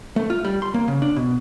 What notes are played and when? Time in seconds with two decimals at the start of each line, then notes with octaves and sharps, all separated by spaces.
0.16 A3
0.30 F4
0.45 G3
0.62 C6
0.74 A#3
0.88 C#3
1.02 D4
1.16 B2